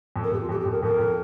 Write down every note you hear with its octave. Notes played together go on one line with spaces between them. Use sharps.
F2
A#4
F2 G4
F4
F2 G4
G4
F2
A#4
F2 A#4
F2